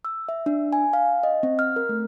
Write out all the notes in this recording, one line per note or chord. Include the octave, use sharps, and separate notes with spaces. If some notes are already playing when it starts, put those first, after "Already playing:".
E6
E5
D4
G#5
F5
D#5
C4
F6
A#4
A3